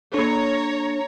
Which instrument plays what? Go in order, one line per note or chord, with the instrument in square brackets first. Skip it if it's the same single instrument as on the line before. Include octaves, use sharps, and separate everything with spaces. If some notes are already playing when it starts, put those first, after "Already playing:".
[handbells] A#3 A4 [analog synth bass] D4 [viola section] C#5 A#5